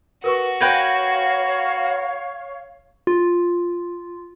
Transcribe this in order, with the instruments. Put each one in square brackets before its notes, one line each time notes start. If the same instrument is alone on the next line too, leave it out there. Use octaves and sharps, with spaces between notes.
[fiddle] F#4 [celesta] A#4 B4 C#6
[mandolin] A#4 B4 G5 [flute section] C#5 F5 C#6 [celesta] G#6 A#6
[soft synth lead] F4